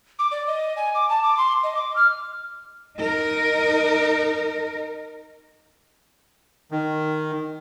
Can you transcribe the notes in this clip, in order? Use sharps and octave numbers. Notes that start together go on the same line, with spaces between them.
D6
D5
D#5
G#5
D6
A5
D6
C6
D#5
D6
F6
D#4 A#4
D#3